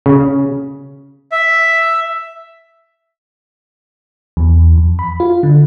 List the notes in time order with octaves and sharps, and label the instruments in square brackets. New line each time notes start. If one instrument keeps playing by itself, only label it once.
[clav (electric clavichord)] C#3
[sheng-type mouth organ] E5
[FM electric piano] E2
F2
B5
F4
D3